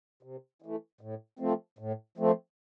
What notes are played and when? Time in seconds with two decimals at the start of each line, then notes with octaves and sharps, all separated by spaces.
0.23 C3
0.62 E3 A3
1.01 A2
1.39 F3 A3 C4
1.79 A2
2.18 F3 A3 C4